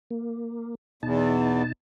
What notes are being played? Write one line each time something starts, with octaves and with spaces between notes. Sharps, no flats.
A#3
E2 B2 D#4 A5